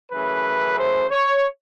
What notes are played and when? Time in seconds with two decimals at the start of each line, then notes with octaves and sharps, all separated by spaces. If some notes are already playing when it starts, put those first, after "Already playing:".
0.12 F#2 C#3 E3 A3 B4
0.78 C5
1.11 C#5